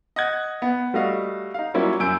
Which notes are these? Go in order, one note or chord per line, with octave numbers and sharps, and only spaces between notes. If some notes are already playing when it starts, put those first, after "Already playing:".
D#5 F#5 F#6 G#6
B3
G3 A3 F#4 D#5 F5
D#4 F5
F#3 G3 A#3 C#4 E4 F4
F#2 G#5 E6 G6 D7